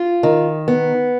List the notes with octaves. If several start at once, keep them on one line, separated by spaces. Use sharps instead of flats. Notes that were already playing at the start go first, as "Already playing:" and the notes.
Already playing: F4
D#3
B3